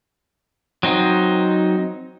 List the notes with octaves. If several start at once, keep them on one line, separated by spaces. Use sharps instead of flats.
F#3 C4 D#4